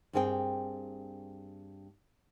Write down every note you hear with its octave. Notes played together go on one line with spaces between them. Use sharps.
G2 A#3 C4 G#4 B4 G5